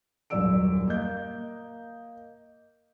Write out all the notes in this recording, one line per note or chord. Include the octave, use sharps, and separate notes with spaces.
D#1 F#2 D5 E6 D7
A#3 D#5 G6